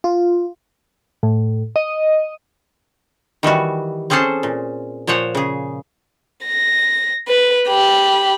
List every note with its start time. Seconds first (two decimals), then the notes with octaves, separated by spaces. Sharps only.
0.04 F4
1.23 A2
1.76 D#5
3.43 D#3 E3 G3 F#4
4.10 C4 C#4 G#4 A4 C5 A5
4.43 A#2
5.07 A#2 F3 C5 C#5 F#5
5.35 C#3 G#4
6.45 A#6
7.28 B4
7.69 G4 B5